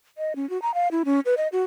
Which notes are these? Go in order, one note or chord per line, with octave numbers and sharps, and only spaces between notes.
D#5
C#4
F#4
A#5
F5
E4
C#4
B4
D#5
F#4